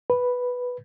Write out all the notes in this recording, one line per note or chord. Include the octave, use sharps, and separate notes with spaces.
B4